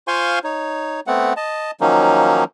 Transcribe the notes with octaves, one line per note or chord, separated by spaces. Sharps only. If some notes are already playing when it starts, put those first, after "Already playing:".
F4 C5 F5 G#5 C6 C#6
D#4 C#5
A3 B3 C4 F#5
D#5 A5
D#3 F3 F#3 A#3 C#4 D#4